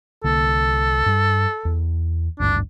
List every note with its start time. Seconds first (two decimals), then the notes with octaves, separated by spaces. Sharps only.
0.24 C2 D3 A#3 A4
1.06 G2 G3
1.65 E2
2.40 G#1 D2 G2 D4